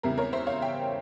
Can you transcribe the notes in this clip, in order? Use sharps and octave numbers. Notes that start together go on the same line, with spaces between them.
E2 C#3 G3 C4 E4 A#4
A#4 C#5
C5 E5
C#5 F5
E5 G5